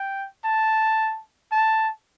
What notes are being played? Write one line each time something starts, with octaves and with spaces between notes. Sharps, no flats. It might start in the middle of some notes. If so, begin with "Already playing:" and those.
Already playing: G5
A5
A5